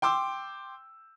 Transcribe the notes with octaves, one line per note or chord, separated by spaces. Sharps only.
G5 C6 D6 E6